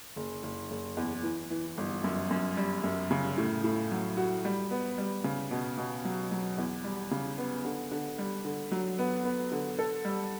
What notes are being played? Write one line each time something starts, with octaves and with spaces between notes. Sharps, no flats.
F#1
F#1
F#1
E2
E3
E3
G1
F#2
F#2
G3
F#2
C#3
A2
A2
F#3
F#4
G3
B3
G3
C#3
B2
B2
F#3
F#3
E2
G3
C#3
B3
D3
D3
G3
D3
F#3
B3
B3
D3
A4
G3